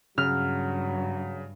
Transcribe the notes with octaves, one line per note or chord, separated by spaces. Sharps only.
G2 C#3 F#3 F6